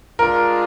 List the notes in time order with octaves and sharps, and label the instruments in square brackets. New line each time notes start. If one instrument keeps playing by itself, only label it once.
[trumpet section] G#3 D4 F4 [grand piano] A#4